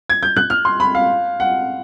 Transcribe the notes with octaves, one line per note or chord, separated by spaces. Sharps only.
G#6
G6
F#6
F6
C6
B5
F5
F#5